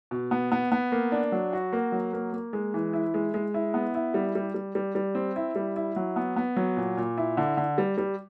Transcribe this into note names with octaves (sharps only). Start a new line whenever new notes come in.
B2
B3
B3
B3
A#3
D4
F#3
F#4
A#3
F#3
A#3
A#3
G#3
E3
E4
G#3
G#3
E4
B3
E4
G3
G3
G3
G3
G3
C4
E4
G3
E4
F#3
B3
B3
F#3
A#2
A#2
E4
D3
D3
G3
G3